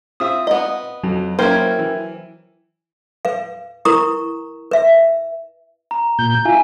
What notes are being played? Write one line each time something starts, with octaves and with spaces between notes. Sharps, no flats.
C4 F4 E5 D#6
B3 D#5
F2 F#3
A#3 C#4 E4 A#4 C5 G5 G#6
E3
B4 F5
E4 A#4 B4 A#5 C#6 D#6
B4 E5
A#5
A#2 G6
E4 F4 G#5